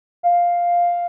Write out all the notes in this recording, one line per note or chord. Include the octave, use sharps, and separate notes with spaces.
F5